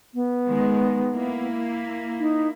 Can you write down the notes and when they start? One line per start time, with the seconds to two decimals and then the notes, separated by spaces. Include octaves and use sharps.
0.14 B3
0.46 D#3 G#3
1.15 A#3 E4
2.20 D#4